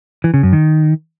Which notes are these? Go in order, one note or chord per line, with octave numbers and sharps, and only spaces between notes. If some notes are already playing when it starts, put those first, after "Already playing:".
E3
C#3
F#2
D#3